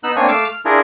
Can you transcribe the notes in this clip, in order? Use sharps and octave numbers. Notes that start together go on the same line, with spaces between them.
B3 D#4 E6 F#6
A#3 C4 D4 C#5 G#5
A3 F5 D6 E6
F6
D4 E4 F4 G#4 A#4